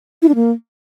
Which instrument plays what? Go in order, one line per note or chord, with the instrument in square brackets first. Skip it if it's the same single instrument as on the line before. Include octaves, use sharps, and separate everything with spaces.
[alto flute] E4
D4
A#3